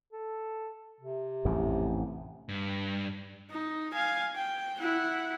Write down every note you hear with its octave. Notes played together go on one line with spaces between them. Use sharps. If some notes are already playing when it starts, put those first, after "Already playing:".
A4
C3
A1 F2 G#2
G2
D#4
F5 G#5
G5
E4 F#5